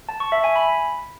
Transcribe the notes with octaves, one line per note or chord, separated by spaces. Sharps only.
A5
C#6
E5
G#5
B5